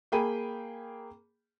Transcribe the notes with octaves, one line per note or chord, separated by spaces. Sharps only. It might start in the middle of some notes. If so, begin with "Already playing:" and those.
A#3 G#4 G5 B5 D#7